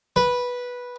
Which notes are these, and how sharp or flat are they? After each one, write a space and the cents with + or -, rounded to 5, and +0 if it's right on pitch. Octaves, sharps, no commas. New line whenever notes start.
B4 -10